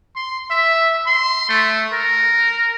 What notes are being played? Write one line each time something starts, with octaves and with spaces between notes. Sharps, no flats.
C6
E5
C6
A3
A#4